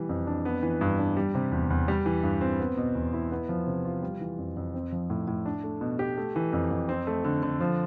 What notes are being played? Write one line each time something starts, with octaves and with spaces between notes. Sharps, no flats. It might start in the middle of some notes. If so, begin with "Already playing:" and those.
Already playing: B2 E3 G3
F2
D4
B3
E3
G2
D4
G3
C3
E2
E2
G3
E3
G2
C4
B3
B2
E2
E4
B3
F3
C3
F4
G3
E3
F2
F2
C4
F3
A2
A2
D4
A3
B2
G4
A3
E3
F2
F2
C4
A3
D3
D3
F3